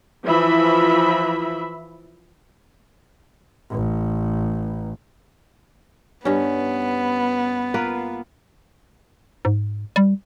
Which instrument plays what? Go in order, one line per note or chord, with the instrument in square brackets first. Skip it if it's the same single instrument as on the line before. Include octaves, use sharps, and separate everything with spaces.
[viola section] E3 F3 E5 B5
[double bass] A1
[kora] G2 C#4 [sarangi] B3
[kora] A#3 F4 B4
[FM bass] G#2
G3